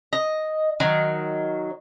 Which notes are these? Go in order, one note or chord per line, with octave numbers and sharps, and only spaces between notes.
D#5
D#3 F#3